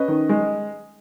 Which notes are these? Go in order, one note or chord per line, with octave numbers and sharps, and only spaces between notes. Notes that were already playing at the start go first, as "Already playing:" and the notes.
Already playing: C#4 B4 D#5
D#3
G#3